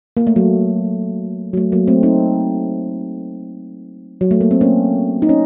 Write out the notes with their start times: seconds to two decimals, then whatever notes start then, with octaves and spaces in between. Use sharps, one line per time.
0.17 A#3
0.27 A3
0.36 F#3
1.53 F#3
1.57 A3
1.72 F#3 A#3
1.88 A3 C4
2.03 C4 D#4
4.21 F#3
4.31 A3
4.41 A#3
4.51 C4
4.61 A#3 C#4
5.22 D#4
5.29 C#4